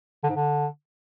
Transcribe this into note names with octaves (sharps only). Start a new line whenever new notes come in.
D3
G#2
D3